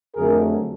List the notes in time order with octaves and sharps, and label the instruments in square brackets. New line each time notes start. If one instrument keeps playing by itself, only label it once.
[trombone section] F2 D3 F#3 A3 G#4 A#4